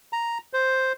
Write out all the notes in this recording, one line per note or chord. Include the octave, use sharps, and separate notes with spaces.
A#5
C5